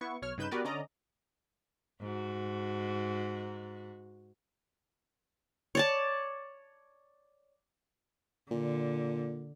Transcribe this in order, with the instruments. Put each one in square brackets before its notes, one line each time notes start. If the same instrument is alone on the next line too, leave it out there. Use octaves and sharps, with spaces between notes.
[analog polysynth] B3 E4 C#6
B1 C#5 F6
G2 C#3 D#4 B4 G6 E7
B3 F#4 G4 A#4 B4 D5
D3 C#4 D5 D#5 A#5
[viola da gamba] G#2 F#4
[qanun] C#5 D5 A5
[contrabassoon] A#2 [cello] D3